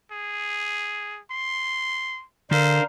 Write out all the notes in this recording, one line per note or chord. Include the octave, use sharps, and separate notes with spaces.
G#4
C6
D3 D4 A#4 C5 F5